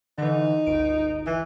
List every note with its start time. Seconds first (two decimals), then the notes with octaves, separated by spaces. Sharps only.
0.18 D3 E3 D#4
0.67 G1 C#2 D7
1.27 E3